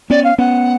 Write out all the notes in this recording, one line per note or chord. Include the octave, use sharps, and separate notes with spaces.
B3 C#4 D5
F5
B3 C#4 F#5